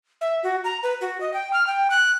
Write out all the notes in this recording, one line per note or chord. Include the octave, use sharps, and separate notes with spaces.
E5
F#4
A#5
B4
F#4
D#5
G5
F6
G5
F#6